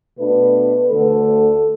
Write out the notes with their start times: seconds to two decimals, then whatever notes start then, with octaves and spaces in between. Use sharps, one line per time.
0.18 B2 A3 D4 B4
0.90 D2 D3 A3 A4